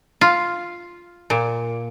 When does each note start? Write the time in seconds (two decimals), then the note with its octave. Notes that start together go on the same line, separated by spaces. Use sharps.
0.21 F4
1.30 A#2